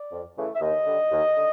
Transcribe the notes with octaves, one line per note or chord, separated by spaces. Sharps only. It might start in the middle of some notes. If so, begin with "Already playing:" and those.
Already playing: D5
F2
C#3 E3 A3
E5
D#2 D#5
D3 G3
D#2
D3